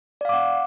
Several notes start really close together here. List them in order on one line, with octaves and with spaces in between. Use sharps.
D5 F5 D6 F#5